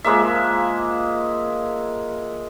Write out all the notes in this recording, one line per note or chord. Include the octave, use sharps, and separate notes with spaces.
F3 G#3 A#3 E5